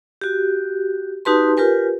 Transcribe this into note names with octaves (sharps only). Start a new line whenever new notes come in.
F#4 G4
D#4 F#4 G4 B4 A5 C6
F4 G4 A#4 B4 G#5